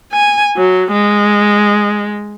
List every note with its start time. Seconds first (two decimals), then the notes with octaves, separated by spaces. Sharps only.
0.13 G#5
0.57 F#3
0.92 G#3